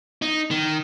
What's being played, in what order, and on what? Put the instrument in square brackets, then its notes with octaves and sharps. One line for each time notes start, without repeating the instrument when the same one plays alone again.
[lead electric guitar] D#4
D#3